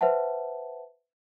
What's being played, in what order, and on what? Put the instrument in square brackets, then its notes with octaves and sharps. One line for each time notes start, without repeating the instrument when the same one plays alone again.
[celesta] B4 C5 E5 F#5 A5